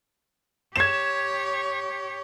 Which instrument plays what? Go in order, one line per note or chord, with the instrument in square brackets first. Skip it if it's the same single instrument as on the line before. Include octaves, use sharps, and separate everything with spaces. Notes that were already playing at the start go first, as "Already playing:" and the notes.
[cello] G4 C#5 [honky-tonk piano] G#6 E7